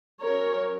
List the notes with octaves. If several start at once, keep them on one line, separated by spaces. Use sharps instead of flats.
F#3 C#4 A#4 C#5